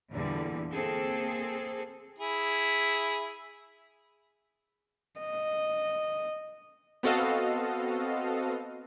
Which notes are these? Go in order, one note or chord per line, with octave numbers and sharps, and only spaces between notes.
E2 A#2 D3 E3 G3
A#3 C4 G#4 A4
E4 G#4
D#5
B3 C4 F#4 A4 D#5 F5